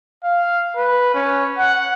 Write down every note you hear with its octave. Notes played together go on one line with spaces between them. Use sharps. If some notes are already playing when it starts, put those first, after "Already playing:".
F5
B4
C#4
F#5